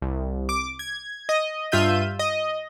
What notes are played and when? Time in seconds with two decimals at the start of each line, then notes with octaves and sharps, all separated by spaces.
0.02 C2
0.49 D6
0.79 G#6
1.29 D#5
1.72 G2 F4 E5 G6 D#7
2.19 D#5